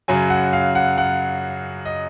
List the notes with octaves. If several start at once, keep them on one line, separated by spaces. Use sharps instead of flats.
F#2 C#3 F#3 G#5
F#5
F5
F#5
F#5
D#5